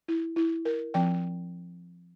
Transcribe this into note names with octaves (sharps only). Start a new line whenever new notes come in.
E4
E4
A#4
F3 C4 G5